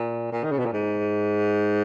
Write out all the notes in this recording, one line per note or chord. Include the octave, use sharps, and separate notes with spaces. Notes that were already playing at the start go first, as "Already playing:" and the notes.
Already playing: A#2
A#2
D#3
C#3
B2
A#2
G#2